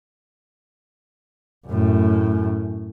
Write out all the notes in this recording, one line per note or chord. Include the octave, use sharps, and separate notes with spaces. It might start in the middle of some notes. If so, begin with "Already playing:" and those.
F#2 A2